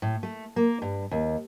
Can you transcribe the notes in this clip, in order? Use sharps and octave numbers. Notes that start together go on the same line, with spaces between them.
A2
A3
A#3
G2
D#2